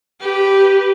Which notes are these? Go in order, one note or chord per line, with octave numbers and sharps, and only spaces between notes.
G4 B4